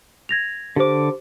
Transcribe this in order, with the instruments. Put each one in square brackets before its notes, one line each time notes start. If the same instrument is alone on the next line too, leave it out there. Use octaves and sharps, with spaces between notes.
[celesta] G#6 A#6 F7
[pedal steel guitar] D3 D6 [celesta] G4 C5